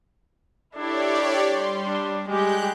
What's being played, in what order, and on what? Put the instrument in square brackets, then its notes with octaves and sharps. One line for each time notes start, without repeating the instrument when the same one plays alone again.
[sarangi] D4 [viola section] E4 A4 [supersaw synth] G4 C#5 D5
[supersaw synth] G3 [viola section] C6
[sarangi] D4
[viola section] G3 G4 [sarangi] G#3 [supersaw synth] F#6 G6